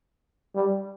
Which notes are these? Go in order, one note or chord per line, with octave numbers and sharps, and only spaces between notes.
G3